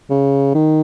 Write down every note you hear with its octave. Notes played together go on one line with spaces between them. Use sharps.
C#3
D#3